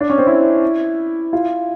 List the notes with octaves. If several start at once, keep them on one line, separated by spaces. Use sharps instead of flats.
D4
C#4
C4
E4
F4